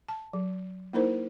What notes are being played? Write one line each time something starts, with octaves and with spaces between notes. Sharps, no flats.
A5
F#3
A#3 D#4 E4 A#4 C5